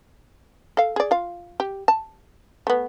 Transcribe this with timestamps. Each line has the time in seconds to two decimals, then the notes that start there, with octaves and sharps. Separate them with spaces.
0.77 A4 F5
0.96 G#4 D5
1.11 F4 F5
1.60 G4
1.88 A5
2.67 A3 B3